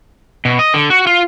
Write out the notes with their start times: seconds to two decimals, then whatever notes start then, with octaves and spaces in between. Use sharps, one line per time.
0.45 B2
0.59 D#5
0.74 D3
0.90 F#4
1.07 F4